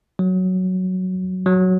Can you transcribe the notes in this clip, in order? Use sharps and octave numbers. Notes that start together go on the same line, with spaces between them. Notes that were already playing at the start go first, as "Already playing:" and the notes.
F#3
F#3